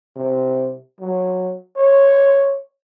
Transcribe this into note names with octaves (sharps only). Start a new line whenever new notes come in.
C3
F#3
C#5